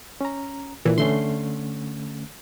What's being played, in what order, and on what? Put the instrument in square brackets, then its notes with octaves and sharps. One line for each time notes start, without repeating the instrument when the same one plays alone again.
[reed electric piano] C#4 A#5
[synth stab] A#2 E3
[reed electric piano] D3 A3 C#4 [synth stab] C6